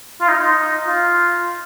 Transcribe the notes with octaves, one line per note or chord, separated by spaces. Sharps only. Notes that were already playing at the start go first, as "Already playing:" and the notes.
F4
D#4
D#4
F4